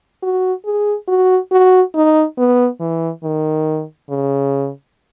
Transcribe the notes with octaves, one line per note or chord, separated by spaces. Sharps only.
F#4
G#4
F#4
F#4
D#4
B3
E3
D#3
C#3